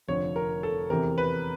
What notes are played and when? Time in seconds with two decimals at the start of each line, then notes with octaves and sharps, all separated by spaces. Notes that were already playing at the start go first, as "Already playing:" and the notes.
0.08 F1 F2 D3 F3 C#5
0.36 A#4
0.63 A4
0.90 E2 C3 E3 A#4
1.18 B4